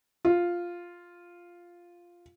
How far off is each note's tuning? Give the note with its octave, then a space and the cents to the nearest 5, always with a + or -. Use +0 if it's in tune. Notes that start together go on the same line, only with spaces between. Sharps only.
F4 +0